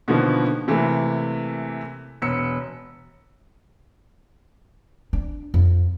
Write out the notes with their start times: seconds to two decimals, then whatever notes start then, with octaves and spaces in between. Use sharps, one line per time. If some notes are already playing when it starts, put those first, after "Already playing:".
0.08 B2 D3 D#3 F3 A#3 B3
0.68 C3 E3 A3 A#3
2.22 E1 B3 E6 C#7
5.13 D4
5.54 F2